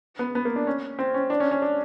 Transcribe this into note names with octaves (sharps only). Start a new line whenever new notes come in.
B3
B3
A#3
D4
C#4
C4
C#4
D4
C#4
C#4
D4